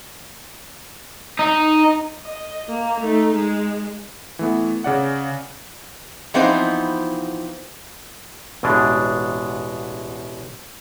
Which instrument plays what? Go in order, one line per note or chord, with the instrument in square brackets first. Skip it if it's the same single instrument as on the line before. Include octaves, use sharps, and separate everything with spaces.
[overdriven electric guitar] D#4
[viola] D#5
A#3
A3 D#4
G#3
[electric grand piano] E3 A3 B3
C#3 D5 F#5
[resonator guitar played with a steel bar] E3 F3 B3 C4 D#4 C5
[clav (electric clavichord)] A1 E2 B2 G#3 D4